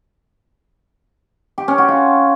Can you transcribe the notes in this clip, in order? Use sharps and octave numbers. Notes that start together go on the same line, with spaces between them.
G4
C#4
F#4
F4